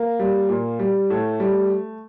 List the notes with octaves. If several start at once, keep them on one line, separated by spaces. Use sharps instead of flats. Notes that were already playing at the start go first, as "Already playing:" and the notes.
Already playing: A#3
G3
A#2
G3
A2 A3
G3